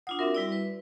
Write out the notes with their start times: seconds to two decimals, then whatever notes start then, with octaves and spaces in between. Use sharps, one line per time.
0.07 D4 F4 F#5 D#6
0.19 C4 F#4 A#4 E5
0.35 G3 E4 D5
0.52 B4